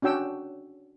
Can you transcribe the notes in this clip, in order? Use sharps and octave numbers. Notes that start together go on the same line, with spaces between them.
C#4 D4 F#4 G5 E6